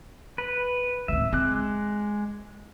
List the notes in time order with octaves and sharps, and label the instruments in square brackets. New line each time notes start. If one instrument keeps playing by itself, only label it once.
[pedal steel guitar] B4
[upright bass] D1 D#2 [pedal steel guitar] E5
[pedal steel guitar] G#3 D6 F#6 [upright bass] C4